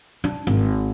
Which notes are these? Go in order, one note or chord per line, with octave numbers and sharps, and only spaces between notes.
D4
G#1